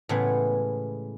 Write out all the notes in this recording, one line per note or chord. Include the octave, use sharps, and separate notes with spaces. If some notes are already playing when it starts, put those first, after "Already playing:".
A2 C#3 E3 G#3 B3